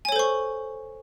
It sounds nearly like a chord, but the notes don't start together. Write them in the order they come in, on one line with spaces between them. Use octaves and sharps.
G#5 C#5 A4 C5 C#6